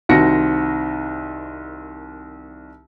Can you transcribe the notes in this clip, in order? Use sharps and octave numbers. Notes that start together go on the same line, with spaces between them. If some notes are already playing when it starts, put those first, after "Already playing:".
C2 D#3 C4 F#4 A#6 C#7